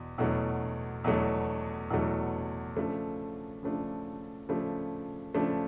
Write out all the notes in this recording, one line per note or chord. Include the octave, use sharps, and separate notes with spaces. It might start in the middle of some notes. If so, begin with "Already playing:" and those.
Already playing: E2 B2
E2 B2 F#3 A3
E2 B2 F#3 A3
E2 B2 F#3 A3
C#3 F3 A3 D4
C#3 F3 A3 D4
C#3 F3 A3 D4
C#3 F3 A3 D4